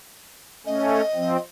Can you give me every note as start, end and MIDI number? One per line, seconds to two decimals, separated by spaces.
0.66 1.01 57
0.66 1.01 61
0.66 1.40 75
1.15 1.37 53
1.15 1.37 60